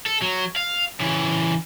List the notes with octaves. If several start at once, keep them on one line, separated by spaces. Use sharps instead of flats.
A4
F#3
F5
C#3 E3